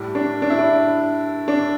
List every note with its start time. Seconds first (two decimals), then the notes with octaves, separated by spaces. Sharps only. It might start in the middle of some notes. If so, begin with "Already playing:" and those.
Already playing: A2 G3
0.15 D4
0.42 D4
0.50 E4
0.59 D4
1.48 D4